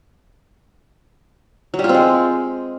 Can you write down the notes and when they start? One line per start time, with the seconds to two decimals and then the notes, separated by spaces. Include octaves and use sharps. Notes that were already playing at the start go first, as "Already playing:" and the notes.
1.74 F#3
1.79 G3
1.84 F4
1.89 C4
1.94 G#3